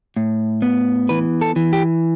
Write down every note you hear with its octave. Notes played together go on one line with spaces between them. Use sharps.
A2
B3
E3 B4
A4
E3
G4